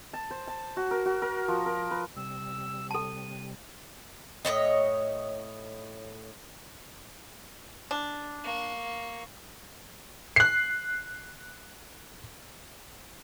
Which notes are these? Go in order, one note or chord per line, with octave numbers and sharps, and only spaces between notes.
A5
C5
A5
F#4
A#4
F#4
A#4
F3
A#4
B4
C3 G3 E6
A4 A5 D#7
A2 G#3 C#5 D#5
D4
A#3 C#6
F#6 C7